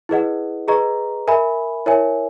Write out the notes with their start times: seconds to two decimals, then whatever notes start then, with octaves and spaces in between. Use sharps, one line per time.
0.09 E4 G#4 B4 D#5 F#5
0.68 G#4 B4 D#5 A#5 C#6
1.27 A#4 E5 G#5 B5
1.86 E4 A#4 C#5 E5 G#5